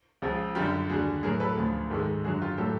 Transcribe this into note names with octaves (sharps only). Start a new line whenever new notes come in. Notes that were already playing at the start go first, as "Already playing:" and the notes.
C#2 C#3 F3
F#2 D3 G3 F4 G4
D#2 D3 G3 F#4 G#4
A2 F#3 G#4 A#4
A4 B4
D2 C#3 F3
G#2 D#3 G#3 G4 A4
F#2 D3 F#3 F#4 G#4
F4 G4
A2 F#3 G4 A4